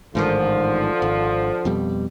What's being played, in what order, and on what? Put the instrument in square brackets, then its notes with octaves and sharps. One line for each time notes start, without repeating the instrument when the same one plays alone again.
[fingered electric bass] A1 G#2 D#3 [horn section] D3 F3
[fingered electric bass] G#1
F2 B2 G3